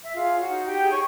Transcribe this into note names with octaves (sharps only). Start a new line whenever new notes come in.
E5
F4 G#4 F5
C#5
F#4 F#5
D#4
D#4 G4 G5
G#4
C#5 C#6